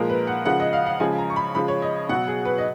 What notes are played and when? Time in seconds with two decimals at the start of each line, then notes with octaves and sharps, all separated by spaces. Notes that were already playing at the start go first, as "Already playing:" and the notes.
Already playing: A#2 F3 G#3 A#4
0.10 B4
0.27 F#5
0.45 C#3 F3 G#3 F#5
0.60 D#5
0.73 F5
0.86 F#5
1.00 C#3 F3 G#3 G#5
1.18 A#5
1.30 C#6
1.36 B5
1.55 C#3 F3 G#3 B5
1.68 C#5
1.82 D#5
2.09 B2 F#3 F#5
2.28 G#4
2.45 B4
2.58 D#5